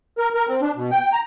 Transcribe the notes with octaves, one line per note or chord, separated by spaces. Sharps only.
A#4
A#4
C4
D4
B2
G5
A#5